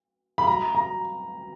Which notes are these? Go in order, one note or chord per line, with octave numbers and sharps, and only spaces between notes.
B5
A#5
A#5